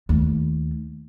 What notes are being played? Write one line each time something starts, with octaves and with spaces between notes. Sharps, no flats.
D#2 A3